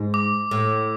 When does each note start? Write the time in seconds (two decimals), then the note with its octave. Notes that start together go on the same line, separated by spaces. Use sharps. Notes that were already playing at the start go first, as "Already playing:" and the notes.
Already playing: G#2
0.14 D6
0.51 A2